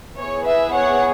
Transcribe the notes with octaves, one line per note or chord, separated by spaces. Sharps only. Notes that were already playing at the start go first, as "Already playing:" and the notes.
B3 E4 G#4 C#5
B4 E5
C#5 F#5